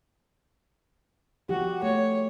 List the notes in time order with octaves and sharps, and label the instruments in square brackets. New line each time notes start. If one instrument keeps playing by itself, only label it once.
[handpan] F3 G4 [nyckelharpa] F#4
[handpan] A3 [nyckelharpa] C#5